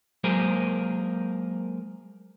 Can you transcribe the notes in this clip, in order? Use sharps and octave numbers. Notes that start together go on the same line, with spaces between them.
F#3 G#3 A#3 G#4 A#4 C5